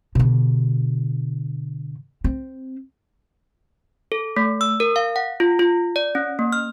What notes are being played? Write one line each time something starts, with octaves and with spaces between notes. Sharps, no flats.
B2 D3
C4
A4
A3
E6
A#4
F5
F#5
F4
F4
D5
C#4
A#3
F6